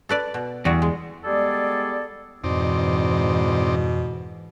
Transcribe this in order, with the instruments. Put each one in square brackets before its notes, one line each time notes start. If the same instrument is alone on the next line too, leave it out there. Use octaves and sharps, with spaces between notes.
[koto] A4 B4 D5
B2
[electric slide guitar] E2 [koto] G3 F#4
[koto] G#3
[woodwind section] G3 G#3 B3 G#4 A4 D5
[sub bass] F2 [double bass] G#2 E3 [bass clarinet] B2 [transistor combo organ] C4 D#4 D5